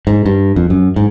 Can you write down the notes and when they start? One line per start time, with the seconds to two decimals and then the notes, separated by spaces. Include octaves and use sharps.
0.07 G#2
0.26 G2
0.56 F2
0.70 F#2
0.96 G#2